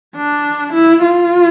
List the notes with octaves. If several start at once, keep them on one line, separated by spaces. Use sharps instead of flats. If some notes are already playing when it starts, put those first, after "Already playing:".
D4
E4
F4